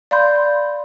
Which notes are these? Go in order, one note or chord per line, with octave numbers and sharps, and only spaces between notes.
D5 F5 B5 C6 G6